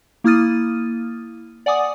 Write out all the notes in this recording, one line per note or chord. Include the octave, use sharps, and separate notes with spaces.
A#3 E4 D#6 F6 A6 D#7
D5 F#5 G#5 D6 D#6